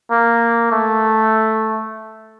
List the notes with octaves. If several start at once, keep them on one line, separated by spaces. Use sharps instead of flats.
A#3
A3